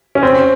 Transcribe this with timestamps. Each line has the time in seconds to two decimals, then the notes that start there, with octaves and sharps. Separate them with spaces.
0.15 C#4
0.23 C4